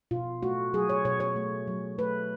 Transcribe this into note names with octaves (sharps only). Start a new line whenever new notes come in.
B2 F4
A3 F#4
F#3 G#4
C#5
B2 C#5
C#5
A3
F#3
A3 B4